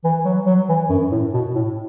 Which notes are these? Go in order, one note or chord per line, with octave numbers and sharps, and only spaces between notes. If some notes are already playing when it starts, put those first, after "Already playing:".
E3
F#3
F#3
E3
F#2
A2
B2
A2